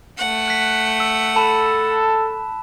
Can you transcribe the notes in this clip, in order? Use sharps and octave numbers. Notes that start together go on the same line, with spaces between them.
A3 F#5
F#6 B6
E6
A4 A5 B5 E7